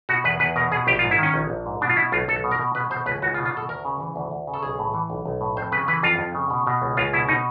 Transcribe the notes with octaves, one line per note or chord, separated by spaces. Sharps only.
B2 F#4
E2 B4
E2 B4
B2 A#4
B2 G#4
A#1 G4
F4
G#2
E4
D#3 C#4
A#1
A#1
G#2
B2 D4
F4
B2 E4
B1 F4
B1 A4
B2
A#4
B2
B2 B4
B2 C5
C#2 B4
C#2 F#4
F4
B2
F4
B2 A4
D2 A#4
C#3
E3
D2
D2
C#3
A4
B1 G#4
A2
E3
B1
B1
A2
F2 C5
C#3 B4
E3 B4
F2 F4
F2
C#3
B2
B2
C#2
C#2 F4
B2 E4
B2 D#4